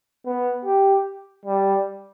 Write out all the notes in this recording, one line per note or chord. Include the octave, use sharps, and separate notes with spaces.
B3
G4
G3